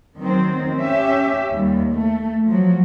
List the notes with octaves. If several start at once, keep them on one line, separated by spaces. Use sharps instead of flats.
D#3 F#3 C4
C#4 G4 E5
D#2 G3
A3
F3 F#3